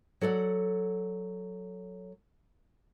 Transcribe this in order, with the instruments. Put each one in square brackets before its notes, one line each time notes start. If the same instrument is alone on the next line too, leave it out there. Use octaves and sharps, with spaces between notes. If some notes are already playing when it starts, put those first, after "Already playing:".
[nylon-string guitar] F#3 A4 D5 F#5